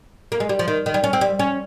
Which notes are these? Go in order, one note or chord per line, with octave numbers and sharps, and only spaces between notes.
A#3
G#3
G3
F3
D#3
D#3
G3
C#4
C4
G3
C#4